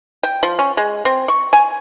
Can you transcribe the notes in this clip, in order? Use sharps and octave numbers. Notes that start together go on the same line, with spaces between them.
G5
F3
C#4
G#3
C4
C#6
G#5